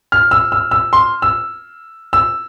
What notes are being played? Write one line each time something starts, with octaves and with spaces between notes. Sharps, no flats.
F6
E6
E6
E6
C6
E6
E6